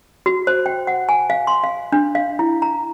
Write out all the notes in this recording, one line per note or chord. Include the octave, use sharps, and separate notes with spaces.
F#4
C5
G5
F#5
G#5
F5
C6
F5
D4
F5
E4
A#5